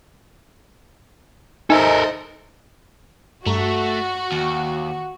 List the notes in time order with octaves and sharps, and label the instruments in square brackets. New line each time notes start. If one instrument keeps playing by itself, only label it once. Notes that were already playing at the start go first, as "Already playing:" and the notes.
[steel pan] D#4 E5 [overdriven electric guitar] A4 A#4 [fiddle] C5 D#5 [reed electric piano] G#5
[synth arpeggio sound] G2 A#5 [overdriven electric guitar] A3 [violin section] F#4
[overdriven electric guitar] D#2